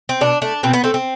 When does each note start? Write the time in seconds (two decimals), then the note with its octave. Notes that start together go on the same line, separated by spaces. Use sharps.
0.09 C4
0.21 B2 D4
0.41 A3 D4
0.63 B2 C4
0.73 B3
0.84 A3 C4
0.94 C4